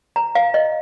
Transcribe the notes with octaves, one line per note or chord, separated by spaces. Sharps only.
A#5
F5
D#5